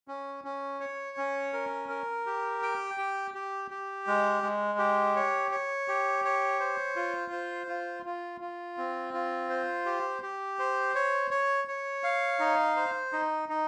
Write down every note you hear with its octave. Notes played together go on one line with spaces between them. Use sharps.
C#4
C#4
C#5
C#4
A#4
A#4
G4
G5
G4
G4
G4
G#3
G#3
G4
C#5
C#5
G4
C#5
C5
F4
C5
F4
F4
F4
C4
F4
C5
G4
G4
C5
C#5
C#5
C#5
F5
D#4
C5
D#4
D#4